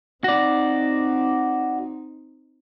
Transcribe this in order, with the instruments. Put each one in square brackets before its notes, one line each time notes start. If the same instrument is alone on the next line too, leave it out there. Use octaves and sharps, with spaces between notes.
[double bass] C4 D#4 [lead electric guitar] F#4 D5